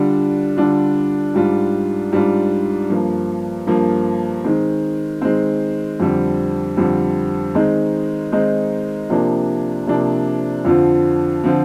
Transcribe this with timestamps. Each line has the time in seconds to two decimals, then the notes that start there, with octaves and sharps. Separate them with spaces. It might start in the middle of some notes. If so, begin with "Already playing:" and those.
Already playing: D3 G3 D4 F4
0.57 D3 G3 D4 F4
1.34 G#2 G3 D4 F4
2.12 G#2 G3 D4 F4
2.90 G2 F3 A#3
3.67 G2 F3 A#3
4.44 D#3 G#3 C4
5.22 D#3 G#3 C4
6.00 F2 D3 G3 C4
6.77 F2 D3 G3 C4
7.55 D#3 G#3 C4 D#4
8.32 D#3 G#3 C4 D#4
9.10 C3 F3 A#3 D4
9.87 C3 F3 A#3 D4
10.65 F2 D3 F3 C4 F4
11.44 D3 F3 C4 F4